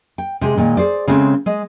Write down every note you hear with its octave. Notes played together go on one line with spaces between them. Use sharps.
G5
C3 G#3 G#4
A#2 D#3 G#3
G#4 C5 D5
C#3 G#3 A3 C4
G#3 D#5